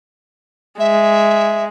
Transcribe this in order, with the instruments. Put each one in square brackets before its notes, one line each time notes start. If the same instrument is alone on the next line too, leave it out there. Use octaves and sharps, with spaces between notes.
[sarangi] G#3 [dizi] E5